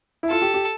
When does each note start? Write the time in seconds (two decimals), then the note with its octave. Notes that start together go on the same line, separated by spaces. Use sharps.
0.23 E4
0.30 F4 A4
0.42 G4
0.54 G4